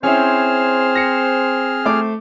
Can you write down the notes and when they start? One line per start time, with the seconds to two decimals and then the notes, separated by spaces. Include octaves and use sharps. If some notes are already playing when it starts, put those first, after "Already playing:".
0.03 C4 C#4 E4 G#4 C5 F6
0.95 A#6 C#7
1.85 A3 D6